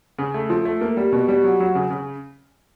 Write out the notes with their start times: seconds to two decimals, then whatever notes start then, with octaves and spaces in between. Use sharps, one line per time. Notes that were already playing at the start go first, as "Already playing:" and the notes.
0.18 C#3
0.34 A3
0.50 F3
0.65 A3
0.81 A#3
0.97 G3
1.12 B2
1.28 G3
1.44 F#3
1.60 F#3
1.75 C#3
1.91 C#3